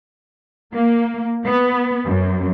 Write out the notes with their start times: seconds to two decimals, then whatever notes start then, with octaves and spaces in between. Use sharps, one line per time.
0.75 A#3
1.46 B3
2.07 F#2